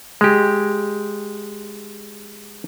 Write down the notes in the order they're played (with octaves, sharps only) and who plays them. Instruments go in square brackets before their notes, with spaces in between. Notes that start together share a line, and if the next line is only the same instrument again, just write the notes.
[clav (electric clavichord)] G#3 G4